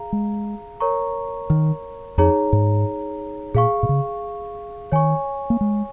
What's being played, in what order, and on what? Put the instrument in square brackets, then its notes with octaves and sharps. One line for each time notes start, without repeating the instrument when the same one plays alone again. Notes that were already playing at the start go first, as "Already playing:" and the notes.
Already playing: [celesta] G#4 F5 A#5
[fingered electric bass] G#3
[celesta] A#4 C#5 A#5 C#6
[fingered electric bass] D#3
[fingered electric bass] F2 [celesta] D#4 G#4 C#5 A#5
[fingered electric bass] G#2
[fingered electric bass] A#2 [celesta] G#4 F5 C#6
[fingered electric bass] A#2
C#3
[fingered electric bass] D#3 [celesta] C#5 G#5 C#6
[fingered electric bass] A#3
G#3